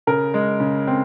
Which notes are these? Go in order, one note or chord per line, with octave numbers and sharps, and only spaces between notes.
C#3 A#4
G#3
C#3
C4